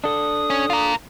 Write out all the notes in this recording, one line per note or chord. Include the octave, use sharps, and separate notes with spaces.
D4 A4 D#6
C#4
F4 A#4